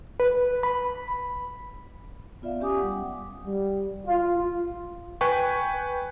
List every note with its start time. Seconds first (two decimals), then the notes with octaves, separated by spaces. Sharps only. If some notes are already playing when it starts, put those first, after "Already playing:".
0.20 B4
0.63 B5
2.42 B3 F4 D5 E5 F5
2.61 C#4 G4 G#5 D6 D#6
2.78 G3 F#5
3.46 G3
4.06 F4
5.21 B4 G5 G#5 C#6